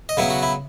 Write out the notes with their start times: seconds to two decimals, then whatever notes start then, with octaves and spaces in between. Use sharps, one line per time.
0.09 D#5
0.17 C#3 F#3 B3 E4
0.30 F#4
0.43 E4